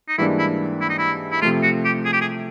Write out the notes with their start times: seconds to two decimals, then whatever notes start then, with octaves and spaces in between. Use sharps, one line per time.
0.08 D#4
0.18 G#2 E3 G3 A#3 D4 E4
0.39 E4
0.81 E4
0.89 D#4
0.98 E4
1.32 E4
1.42 C3 F3 A3 F4
1.63 F#4
1.85 G4
2.05 G#4
2.13 G4
2.21 G#4